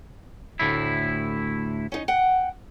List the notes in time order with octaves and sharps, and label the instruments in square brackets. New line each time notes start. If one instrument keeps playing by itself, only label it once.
[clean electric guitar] D2 A2 E4
[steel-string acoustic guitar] C#4 D#4
F#5 G5